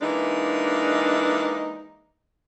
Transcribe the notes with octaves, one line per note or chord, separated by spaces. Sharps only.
E3 G#3 A#3 D4 D#4